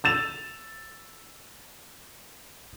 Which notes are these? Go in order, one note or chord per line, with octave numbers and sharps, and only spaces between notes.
E6 A6 E7 F7